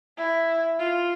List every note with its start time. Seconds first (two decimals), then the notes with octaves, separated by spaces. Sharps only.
0.17 E4
0.79 F4